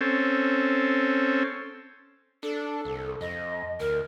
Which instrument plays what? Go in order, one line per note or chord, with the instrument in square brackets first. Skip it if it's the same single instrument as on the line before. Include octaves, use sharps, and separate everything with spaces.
[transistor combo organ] C4 C#4 A4
[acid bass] D4 [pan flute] A4
[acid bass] C2
[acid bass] F2 [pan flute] D#5
[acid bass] D2 [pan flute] A#4